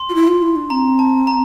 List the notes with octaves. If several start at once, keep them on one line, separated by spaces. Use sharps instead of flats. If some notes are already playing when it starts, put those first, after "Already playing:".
Already playing: C6
F4
E4
F4
E4
D4
C4 A#5
A5
A#5